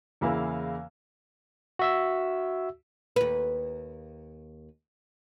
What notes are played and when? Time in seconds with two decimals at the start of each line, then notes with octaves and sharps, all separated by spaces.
0.21 E2 C#3 A#3 E4 A#4 F5
1.79 F#4 E5 E6
3.16 D#2 B4